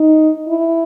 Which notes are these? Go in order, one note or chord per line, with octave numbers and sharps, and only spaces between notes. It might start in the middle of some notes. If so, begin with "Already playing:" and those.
Already playing: D#4
E4